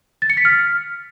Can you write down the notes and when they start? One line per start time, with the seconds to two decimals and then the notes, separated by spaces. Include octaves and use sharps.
0.22 A6
0.30 C#7
0.37 B6
0.45 F6